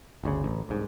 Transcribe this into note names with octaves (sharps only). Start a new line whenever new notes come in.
G1 D2 C#3
A1
C2 G#2